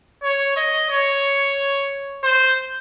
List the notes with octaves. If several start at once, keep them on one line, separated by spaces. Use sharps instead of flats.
C#5
D#5
C#5
C5